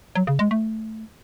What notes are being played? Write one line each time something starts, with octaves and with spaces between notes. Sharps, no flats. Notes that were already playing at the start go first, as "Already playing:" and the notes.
F#3
C#3
G#3
A3